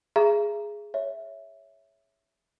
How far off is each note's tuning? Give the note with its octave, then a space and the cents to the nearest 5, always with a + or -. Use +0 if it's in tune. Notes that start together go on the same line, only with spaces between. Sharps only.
G#4 +0 E5 +40 A#5 +0
C#5 +5 E5 +0